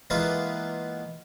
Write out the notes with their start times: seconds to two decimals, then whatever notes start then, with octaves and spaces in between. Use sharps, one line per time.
0.10 E3 G#3 A#3 B3 F4 B4